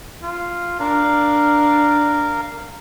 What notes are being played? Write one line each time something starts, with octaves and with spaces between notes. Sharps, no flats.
F4
D4 A#4 F5